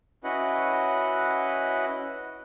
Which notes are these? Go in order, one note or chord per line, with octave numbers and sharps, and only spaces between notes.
C#4 E4 F#4 B4 D#5 F#5